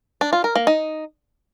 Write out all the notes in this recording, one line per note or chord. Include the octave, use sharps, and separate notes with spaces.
D4
F4
A#4
A#3
D#4